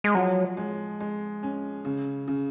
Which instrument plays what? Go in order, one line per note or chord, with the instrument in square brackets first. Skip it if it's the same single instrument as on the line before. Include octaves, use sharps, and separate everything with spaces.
[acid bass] G#3
[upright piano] F3 [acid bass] F#3
[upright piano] G#3
G#3
C#4
C#3
C#3